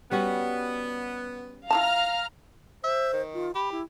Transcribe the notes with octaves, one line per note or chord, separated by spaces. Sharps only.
G3 B3 C#4 F#4
E4 F4 F5 A5 A#5 F6
C5 E5
D#3
F4
G4 B5
E4